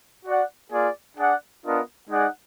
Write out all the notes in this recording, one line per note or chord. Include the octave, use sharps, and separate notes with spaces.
F#4 D5 F#5
A#3 F4 G#4 D5
D4 G#4 D5 F#5
B3 D4 F4 A#4 D#5
G#3 D#4 G#4 D5 F#5